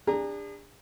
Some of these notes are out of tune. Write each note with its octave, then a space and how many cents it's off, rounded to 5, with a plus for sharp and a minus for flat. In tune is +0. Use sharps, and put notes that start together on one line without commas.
D4 +0 G#4 -40 A#5 +0